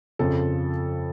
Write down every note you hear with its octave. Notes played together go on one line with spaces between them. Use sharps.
F2 C#3 F3 A4